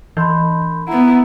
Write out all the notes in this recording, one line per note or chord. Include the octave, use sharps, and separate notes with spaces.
E3 B5 C6 G6
B3 E4 F#5 A#5